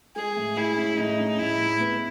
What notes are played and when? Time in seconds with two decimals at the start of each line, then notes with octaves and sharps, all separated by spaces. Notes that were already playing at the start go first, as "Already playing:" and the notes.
0.16 G#3 G#4
0.36 A2
0.57 G#3 E4
0.77 C#4
0.98 A2 D#4
1.19 C#4
1.39 A2 E4
1.59 A2
1.80 B3